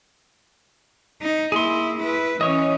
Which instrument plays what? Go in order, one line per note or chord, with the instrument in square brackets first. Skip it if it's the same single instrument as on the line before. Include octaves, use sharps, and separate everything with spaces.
[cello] D#4
[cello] A#3 E4 [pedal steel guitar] G#4 C6
[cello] E4 B4
[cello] E3 C#4 [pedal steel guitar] C#5 D#5